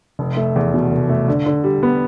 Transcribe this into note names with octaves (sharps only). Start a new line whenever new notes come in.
F1
A3
E2
B2
F1
A3
D3
D3
G3
B3